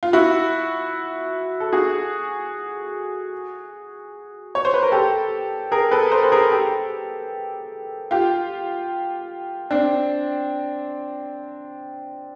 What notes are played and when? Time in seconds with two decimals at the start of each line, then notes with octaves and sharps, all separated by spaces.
0.03 F4
0.13 E4 F#4
1.60 A4
1.73 F#4 G#4
4.55 C#5
4.65 C5
4.74 B4
4.83 A#4
4.92 G4 A4
5.72 G#4 A#4
5.91 A4 B4
6.12 A#4 C5
6.23 B4
6.32 G#4 A#4
6.52 G4 A4
8.11 F4 G4
9.71 C4 D4